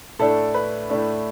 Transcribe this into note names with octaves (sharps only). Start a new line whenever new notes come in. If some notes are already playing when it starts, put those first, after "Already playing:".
A2 A3 D4 A4
B4
A2 A3 D4